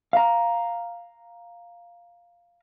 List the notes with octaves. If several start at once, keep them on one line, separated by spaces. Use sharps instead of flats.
F5 A#5